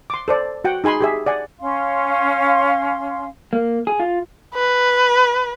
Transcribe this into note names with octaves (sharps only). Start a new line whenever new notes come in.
C6 D6
A4 C5 D5
F#4 F#5 G5
D#4 G#4 G#5 B5 C6
G4 G#4 E5
D5 F#5 G#5
C#4 F5 C6
A#3
G#4
F4
B4